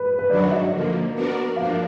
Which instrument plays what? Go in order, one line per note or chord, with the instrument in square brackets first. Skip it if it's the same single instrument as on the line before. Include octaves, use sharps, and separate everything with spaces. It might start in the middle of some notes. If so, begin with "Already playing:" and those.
Already playing: [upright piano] B4
B4
[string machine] D#3 F#3 D4 F#4 [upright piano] D5
[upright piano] D5
D#5
[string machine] D3 F3 A#3
B3 D4 F#4 A#4 D5
[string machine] F3 A#3 D4 [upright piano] F5